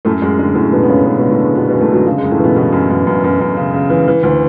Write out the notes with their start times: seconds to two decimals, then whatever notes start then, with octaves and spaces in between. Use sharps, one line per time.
0.05 F#2 A2 A3
0.22 F#2 G#3
0.39 D3 G#3
0.55 F#2 A2 A3
0.72 B2 D3 B3
0.83 B3
0.88 F#2 C#3 C#4
1.05 F#2 B2 B3
1.18 B2 B3
1.22 D3
1.30 A2 A3
1.39 D3 G#3
1.56 B2 D3 B3
1.68 B2 B3
1.73 F#2
1.81 A2 A3
1.90 D3 F#3
2.07 C#3 F#3
2.18 G#3
2.23 F#2
2.31 A2 A3
2.39 B2 E3 B3
2.56 B2 E3 B3
2.73 F#2
2.90 F#2
3.07 F#2
3.24 F#2
3.41 F#2
3.57 C#3
3.74 C#3
3.90 E3
4.08 E3
4.23 D2